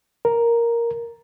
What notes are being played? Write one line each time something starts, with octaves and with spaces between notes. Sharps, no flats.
A#4